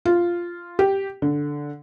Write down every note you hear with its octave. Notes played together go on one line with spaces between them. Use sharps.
F4
G4
D3